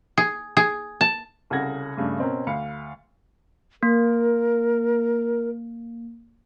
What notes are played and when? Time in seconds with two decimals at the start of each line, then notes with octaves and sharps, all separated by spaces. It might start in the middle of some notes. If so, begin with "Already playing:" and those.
0.18 G#4
0.57 G#4
1.01 A5
1.50 C2 C#3 A4 F#5 G#6 A#6
1.97 G2 C#3 A3 D4
2.18 B2 C4 C#4 A#4
2.47 D2 F5 B5 C#7
3.83 A#3 A#4